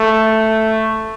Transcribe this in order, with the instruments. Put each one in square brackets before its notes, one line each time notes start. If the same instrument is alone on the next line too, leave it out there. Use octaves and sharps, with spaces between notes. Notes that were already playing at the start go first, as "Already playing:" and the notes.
Already playing: [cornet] A3